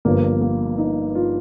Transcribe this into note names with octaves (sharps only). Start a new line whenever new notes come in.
G1 G2 F3 A#3
A#3
D#4
F4